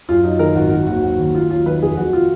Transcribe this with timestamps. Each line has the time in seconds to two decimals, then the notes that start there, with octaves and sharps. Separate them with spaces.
0.09 F#2 F4
0.24 F#3 D#4
0.39 D#3 A#4
0.55 G#1 F#4
0.71 D#3 F#4
0.87 D#2 F#4
1.03 F#3 F#4
1.19 D#2
1.35 D#2 F4
1.50 F#3 F4
1.66 D#3 B4
1.82 F1 G#4
1.97 F2 F#4
2.13 F4